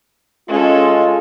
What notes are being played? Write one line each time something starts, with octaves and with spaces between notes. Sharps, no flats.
G#3 C#4 F4 A4